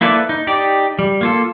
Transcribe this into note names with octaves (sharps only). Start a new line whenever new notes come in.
A#3 E4 A4 B4 D5
D#4
D#4 G4 D5
G3
A#3 F4 A4